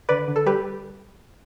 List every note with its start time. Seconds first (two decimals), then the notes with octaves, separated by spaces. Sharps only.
0.09 D3 B4 D5
0.28 D3
0.36 A4
0.46 G3 G4 B4